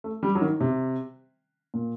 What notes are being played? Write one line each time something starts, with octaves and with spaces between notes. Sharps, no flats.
A3
G3
F#3
D#3
C3
A#2